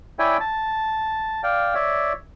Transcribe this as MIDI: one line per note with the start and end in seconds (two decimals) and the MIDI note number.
0.19 0.37 64
0.19 0.37 73
0.19 0.37 74
0.19 0.37 76
0.19 0.37 79
0.19 0.37 80
0.40 1.42 81
1.43 1.74 74
1.43 1.74 77
1.43 1.74 79
1.75 2.13 73
1.75 2.13 74
1.75 2.13 76